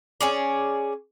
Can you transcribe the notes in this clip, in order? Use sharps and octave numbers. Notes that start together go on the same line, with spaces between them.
C#4 G#4 D5